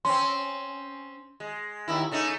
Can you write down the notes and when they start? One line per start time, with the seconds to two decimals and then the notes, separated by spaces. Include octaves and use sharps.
0.05 C4 C#4 C6
1.40 G#3
1.88 D#2 D#3 E4
2.11 C#3 A3 D#4